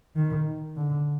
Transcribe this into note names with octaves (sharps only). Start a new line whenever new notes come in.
D#3
D3